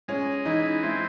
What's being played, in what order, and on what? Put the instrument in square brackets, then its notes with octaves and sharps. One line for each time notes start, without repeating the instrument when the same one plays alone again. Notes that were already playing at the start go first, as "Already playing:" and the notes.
[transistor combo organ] G#3 [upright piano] C#4
[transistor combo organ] E3 [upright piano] D#4
[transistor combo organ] C4 [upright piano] E4